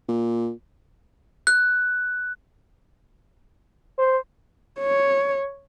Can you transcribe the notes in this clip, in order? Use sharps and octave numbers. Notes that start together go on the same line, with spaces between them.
A#2
F#6
C5
C#5